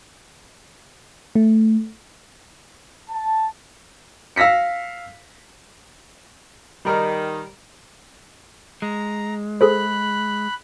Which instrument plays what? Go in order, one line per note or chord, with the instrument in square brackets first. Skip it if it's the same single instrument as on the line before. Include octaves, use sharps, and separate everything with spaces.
[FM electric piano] A3
[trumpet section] A5
[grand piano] F5 E6 A#6 B6 C#7
[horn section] D#3 [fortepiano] G3 A#4
[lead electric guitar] G#3 [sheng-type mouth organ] A#5
[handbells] G#4 A4 C5 [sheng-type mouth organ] B5 F#6